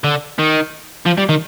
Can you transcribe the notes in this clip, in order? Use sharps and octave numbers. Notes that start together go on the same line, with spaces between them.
D3
D#3
F3
G3
D#3